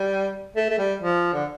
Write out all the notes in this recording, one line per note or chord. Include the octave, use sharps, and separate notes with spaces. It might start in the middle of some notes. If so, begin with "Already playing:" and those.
Already playing: G3
A3
A3
G3
F3
D3